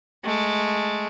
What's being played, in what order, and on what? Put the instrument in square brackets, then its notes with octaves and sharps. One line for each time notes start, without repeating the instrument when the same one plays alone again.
[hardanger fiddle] G#3 A3